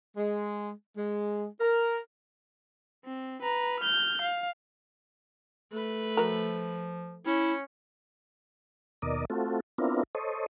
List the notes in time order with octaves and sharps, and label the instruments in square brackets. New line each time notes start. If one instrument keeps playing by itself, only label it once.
[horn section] G#3
G#3
A#4
[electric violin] C4
B4 A#5
F6 G6
F5
[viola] A3 B4
[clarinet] F3 [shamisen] F#4 A#4
[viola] C#4 [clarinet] E4
[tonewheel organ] D#2 B2 A#4 D5 D#5
A3 C4 F4 F#4 A4
B3 C4 D4 E4 F4 A#4
A4 C5 C#5 D#5